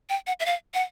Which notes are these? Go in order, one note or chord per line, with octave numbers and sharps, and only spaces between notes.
G5
F#5
E5
F5
F#5